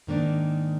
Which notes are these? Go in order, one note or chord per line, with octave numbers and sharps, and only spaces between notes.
G#2 D#3 A#3 D4